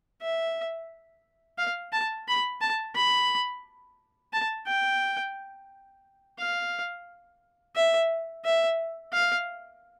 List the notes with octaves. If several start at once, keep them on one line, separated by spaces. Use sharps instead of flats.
E5
F5
A5
B5
A5
B5
A5
G5
F5
E5
E5
F5